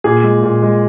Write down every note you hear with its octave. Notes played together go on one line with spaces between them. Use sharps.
A#2 G#4
G#3
A#2
G#3